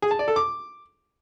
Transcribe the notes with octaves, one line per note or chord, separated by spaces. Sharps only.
G#4
A5
D5
A4
D6